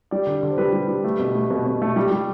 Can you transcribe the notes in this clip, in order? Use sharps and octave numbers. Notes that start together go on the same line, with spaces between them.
G3 D5
D3
D3
C5
G3 B4
G3
G3
A3
B2
A3
B2
B2
A3
G3
G3